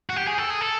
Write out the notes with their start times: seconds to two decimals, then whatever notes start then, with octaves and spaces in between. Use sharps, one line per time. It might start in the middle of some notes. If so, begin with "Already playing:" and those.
0.10 F#4
0.16 G4
0.27 G#4
0.38 A4
0.50 G#4
0.61 A4